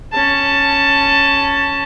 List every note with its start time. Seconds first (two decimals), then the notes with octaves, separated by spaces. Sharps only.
0.12 C#4 A5